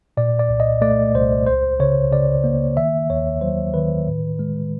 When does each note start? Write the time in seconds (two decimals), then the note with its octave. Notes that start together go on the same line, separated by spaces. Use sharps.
0.17 A#2 D5
0.39 D5
0.49 C2
0.60 D#5
0.81 A3 D5
1.14 C2 C5
1.46 C#2 C5
1.80 C#3 C#5
2.11 C#3 D5
2.44 A#3
2.77 D#3 E5
3.09 D#2 C#5
3.41 F#3 C5
3.74 D#3 B4
4.07 A2
4.39 G#3